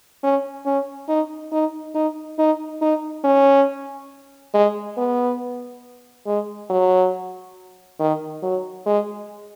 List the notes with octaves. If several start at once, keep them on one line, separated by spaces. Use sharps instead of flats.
C#4
C#4
D#4
D#4
D#4
D#4
D#4
C#4
G#3
B3
G#3
F#3
D#3
F#3
G#3